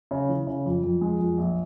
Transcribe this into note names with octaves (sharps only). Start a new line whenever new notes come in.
C#3
E3
C#3
F2
F2
G#3
F2
A#1